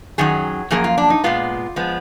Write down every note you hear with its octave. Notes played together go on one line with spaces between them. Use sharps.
F#2 D#3 F#3 G#4
F#2 F3 A#3 G#4
F4
D4
D#4
A#2 G#3 B3 F4
F3 G#3 B3